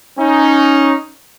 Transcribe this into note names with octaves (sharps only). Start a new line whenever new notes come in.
C#4 D#4